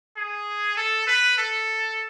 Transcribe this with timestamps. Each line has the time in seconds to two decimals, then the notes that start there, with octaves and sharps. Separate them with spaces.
0.17 G#4
0.77 A4
1.07 B4
1.38 A4